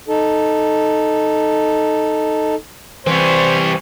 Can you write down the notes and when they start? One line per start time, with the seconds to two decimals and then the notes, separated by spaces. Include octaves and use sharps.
0.08 D#4 A4
3.07 E3 G3 C4 C5 G#5 C#6